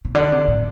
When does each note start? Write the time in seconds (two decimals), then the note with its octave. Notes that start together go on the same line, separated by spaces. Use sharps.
0.05 C3
0.15 D3 D5
0.32 C3
0.48 A2